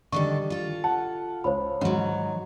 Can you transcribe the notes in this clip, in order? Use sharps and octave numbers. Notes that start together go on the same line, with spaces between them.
D3 D#3 G3 D4 A4 C#6
F4 A4
F#5 A5
C#2 C5 C#5 B5
G#2 D#3 F#3